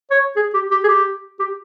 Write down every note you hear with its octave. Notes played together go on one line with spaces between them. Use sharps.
C#5
G#4
G4
G4
G#4
G4
G4